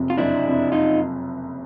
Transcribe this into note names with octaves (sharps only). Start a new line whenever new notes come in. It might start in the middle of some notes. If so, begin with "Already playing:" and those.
Already playing: F#1 F2 C3
F4
F#1 D4 E4
F2 C3
D#4 F4